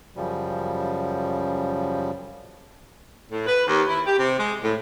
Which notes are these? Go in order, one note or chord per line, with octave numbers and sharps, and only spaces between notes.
F#2 C#3 F3 G3
A2
B4
D#2
E4
G4
C3
G#3
A2